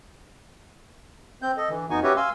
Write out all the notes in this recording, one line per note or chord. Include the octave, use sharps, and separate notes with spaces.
C4 G6
A4 D#5
D3 E3
F2 B3 D#4 F#4 G#5 C#6
C#4 F#4 G4 B4 C#5 E5
F5 G#5 C6 E6